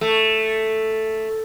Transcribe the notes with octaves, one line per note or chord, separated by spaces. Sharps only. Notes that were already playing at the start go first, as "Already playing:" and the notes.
A3